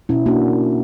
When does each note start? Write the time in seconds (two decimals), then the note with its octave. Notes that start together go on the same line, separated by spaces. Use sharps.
0.09 B2 C#4 E4
0.26 A#3 D4 F#4